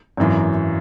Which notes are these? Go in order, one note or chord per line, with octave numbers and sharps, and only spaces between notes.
G#1 F#2 E3